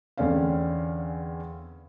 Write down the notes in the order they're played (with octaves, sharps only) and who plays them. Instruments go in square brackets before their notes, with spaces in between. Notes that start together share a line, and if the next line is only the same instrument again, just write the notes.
[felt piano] E2 D3 C4 C#4 F5